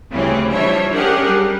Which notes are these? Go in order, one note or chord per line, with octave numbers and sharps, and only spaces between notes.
D2 C#3 E3 G3 C4 C#4
E3 F3 G3 D4 C#5 E5
C#4 D4 G4 G#4 A#4 F#5
G3